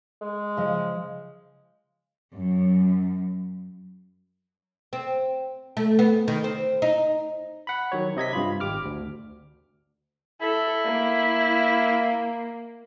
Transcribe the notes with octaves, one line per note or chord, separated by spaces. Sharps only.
G#3
C#3 F3 D#5
F#2
C4
A3
B3
D#3
C4
D#4
F#5 B5
D#3 F#3 C#5
C3 D#5 G#6 B6
G2 F4 B5
G#1 G4 D6 F6
D2
E4 A4
A#3